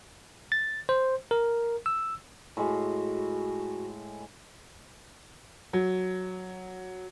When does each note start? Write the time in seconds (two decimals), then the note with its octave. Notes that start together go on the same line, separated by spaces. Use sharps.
0.52 A6
0.89 C5
1.31 A#4
1.86 E6
2.57 A2 G#3 F#4
5.73 F#3